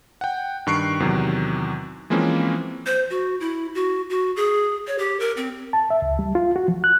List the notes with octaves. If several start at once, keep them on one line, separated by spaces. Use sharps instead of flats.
F#5 G5
G2 D#3 C#6 F#6 C7 D7
E2 C3 D#3 F#3
E3 F3 G#3 A#3 C4 C#4
C5
F#4
E4
F#4
F#4
G#4
C#5
G4
A#4
C4
A5
E5
C#2
G3
F4
F#4
F3
F#6